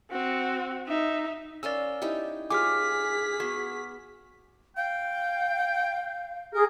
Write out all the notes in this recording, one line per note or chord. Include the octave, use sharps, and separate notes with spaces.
C4 F#4
D#4 E5
C#4 A#4 D5 F5 E6
D#4 E4 G4
F4 G4 G#4 C#5 G#5 D6 F6 B6
B3 F#4
F5 G5
G#4 A#4